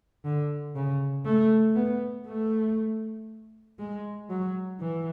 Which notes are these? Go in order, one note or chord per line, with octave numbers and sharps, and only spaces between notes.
D3
C#3
A3
B3
A3
G#3
F#3
E3